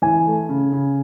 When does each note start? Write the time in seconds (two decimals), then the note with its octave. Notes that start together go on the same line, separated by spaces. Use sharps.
0.02 E3 G#5
0.26 A3
0.49 C#3
0.72 C#3